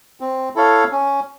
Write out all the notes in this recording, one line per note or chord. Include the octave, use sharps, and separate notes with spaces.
C4
E4 A4 C#5 F5
C#4